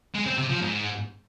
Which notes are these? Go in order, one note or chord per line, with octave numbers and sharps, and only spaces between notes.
G#3
C4
C3
F3
G#2